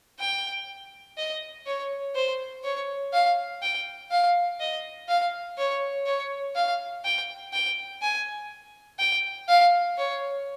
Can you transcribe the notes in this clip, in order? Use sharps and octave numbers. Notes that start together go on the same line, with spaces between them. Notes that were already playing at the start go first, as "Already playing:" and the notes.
G5
D#5
C#5
C5
C#5
F5
G5
F5
D#5
F5
C#5
C#5
F5
G5
G5
G#5
G5
F5
C#5